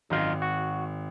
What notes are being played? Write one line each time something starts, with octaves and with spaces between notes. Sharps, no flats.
G#1 F#2 D#4 F4
F#4